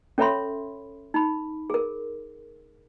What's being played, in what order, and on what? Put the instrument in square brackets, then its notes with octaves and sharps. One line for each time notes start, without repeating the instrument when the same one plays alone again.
[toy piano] C#4 A4 C#5 E5 B5 C6
D#4 B5
G#4 A#4